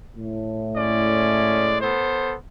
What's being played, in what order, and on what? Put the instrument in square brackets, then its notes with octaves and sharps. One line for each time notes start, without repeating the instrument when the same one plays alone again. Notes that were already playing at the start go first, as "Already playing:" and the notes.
[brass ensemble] A2
[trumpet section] G#3 C#4 D5
B3 A4 C5